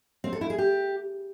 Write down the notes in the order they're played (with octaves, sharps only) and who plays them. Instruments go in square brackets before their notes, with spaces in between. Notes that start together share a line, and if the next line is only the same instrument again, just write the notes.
[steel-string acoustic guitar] C4
A4
E4
G#4
G4